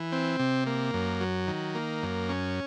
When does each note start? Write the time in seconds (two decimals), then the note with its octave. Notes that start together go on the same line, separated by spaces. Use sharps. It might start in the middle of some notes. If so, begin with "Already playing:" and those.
Already playing: E3
0.12 C4
0.39 C3
0.67 A#3
0.94 F#2
1.21 F#3
1.47 D#3
1.75 A#3
2.03 F#2
2.29 C#4